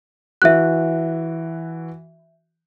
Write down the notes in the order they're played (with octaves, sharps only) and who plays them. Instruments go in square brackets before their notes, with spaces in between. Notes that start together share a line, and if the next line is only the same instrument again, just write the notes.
[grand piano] E3 F#4 [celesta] E5 F#6